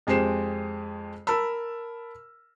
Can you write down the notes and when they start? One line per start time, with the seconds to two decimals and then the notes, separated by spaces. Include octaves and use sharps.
0.07 F2 G#3 G4 C5 C7 E7
1.27 A#4 A5 B5 E6